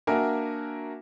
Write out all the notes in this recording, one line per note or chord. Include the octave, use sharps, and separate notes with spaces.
A#3 D4 F#4 A#4 E5 G#5